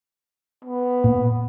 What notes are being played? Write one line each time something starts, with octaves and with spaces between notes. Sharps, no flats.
B3
A#2